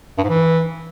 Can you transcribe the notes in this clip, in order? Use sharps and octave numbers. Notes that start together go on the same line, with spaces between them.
G2
G#2
E3